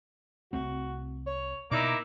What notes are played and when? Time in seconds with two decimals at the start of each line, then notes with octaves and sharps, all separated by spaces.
0.53 C2 A3 C4 F#4
1.26 C#5
1.71 B2 A#3 D#4 E4 D6